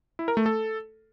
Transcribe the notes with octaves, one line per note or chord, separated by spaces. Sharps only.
E4
A#4
A3
A4